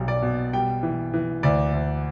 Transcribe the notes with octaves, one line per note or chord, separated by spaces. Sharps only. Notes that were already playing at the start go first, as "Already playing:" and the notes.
Already playing: B1 G3
D5
B2
G3 G5
E3
E3
D2 D5
D2